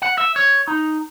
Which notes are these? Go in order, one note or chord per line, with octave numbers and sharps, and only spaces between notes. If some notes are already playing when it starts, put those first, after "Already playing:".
F#5
E5
C#5
D#4